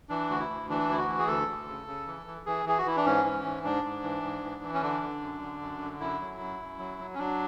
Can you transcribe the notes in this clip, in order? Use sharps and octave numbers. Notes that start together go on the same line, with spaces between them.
E3 D4
D2 F#4
E4
D2
E3 D4
D2 E4
F#4
E3
G#4
D2 A4
D2
C#3
C#3
E3
E3
E3 G#4
E3 G#4
F#4
E3 E4
D4
G#2 C#4
E3
G#2
G#2 D4
G#2
E3
G#2
E3
E3
C#4
D3 D4
D3
F#2
D3
F#2
D3
F#2 E4
F#3
F#2
F#2
F#3
F#3
C#4
F#3 D4